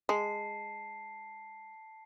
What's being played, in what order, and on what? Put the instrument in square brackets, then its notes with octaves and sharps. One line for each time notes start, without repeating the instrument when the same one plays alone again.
[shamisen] G#3 [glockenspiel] A5 C7